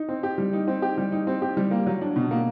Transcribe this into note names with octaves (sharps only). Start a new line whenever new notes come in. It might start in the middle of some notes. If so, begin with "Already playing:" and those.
Already playing: D#4
C4
G4
G3
D#4
C4
G4
G3
D#4
C4
G4
G3
A#3
F#3
D4
B2
A#3